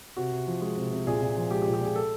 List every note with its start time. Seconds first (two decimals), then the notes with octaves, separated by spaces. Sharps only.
0.17 C3 F#4
0.32 C3
0.47 F3
0.62 G#3
0.77 C3
0.92 C3
1.07 A#2 G#4
1.22 A#2
1.37 F3
1.51 G#3 G4
1.62 G4
1.67 A#2
1.74 G4
1.81 A#2 G#4
1.96 A4